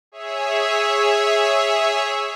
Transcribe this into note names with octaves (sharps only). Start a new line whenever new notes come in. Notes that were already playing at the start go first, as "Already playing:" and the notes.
G#4 C#5 E5